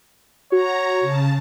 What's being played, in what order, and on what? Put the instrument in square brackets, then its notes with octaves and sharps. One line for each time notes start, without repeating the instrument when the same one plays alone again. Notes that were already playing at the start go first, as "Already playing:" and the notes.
[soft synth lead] F#4 [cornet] C#5 [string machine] A#5
[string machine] C#3 A5